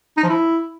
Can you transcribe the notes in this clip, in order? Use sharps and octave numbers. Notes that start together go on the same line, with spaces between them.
D#4
F3
E4